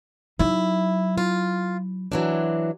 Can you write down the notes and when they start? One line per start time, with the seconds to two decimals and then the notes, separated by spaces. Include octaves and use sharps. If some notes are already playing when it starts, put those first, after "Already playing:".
0.39 F#3 D#4 E4
1.18 F4
2.12 E3 F#3 D4